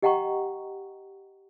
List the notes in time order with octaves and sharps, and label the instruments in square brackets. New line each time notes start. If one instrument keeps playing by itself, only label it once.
[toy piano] G4 D#5 F#5 G5 A#5 C#6